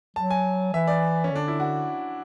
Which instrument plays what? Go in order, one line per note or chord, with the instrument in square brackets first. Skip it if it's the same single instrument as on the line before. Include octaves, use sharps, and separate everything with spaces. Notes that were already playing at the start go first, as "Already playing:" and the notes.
[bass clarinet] F#3 [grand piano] A5
[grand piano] G#5
[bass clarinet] E3 [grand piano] E5
[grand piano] D5
C#4
[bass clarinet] D3 [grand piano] D4
[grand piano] E4
F#4